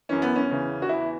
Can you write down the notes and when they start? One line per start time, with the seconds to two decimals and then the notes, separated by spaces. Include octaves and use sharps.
0.09 F#2 E3 C#4
0.22 B3
0.36 C#4
0.49 E2 C#3 E3
0.82 F#4
0.89 E2 E3 E4